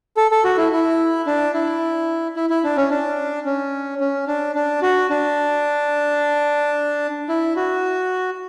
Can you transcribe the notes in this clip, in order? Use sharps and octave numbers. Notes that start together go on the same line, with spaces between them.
A4
A4
F#4
E4
E4
D4
E4
E4
E4
D4
C#4
D4
C#4
C#4
D4
D4
F#4
D4
E4
F#4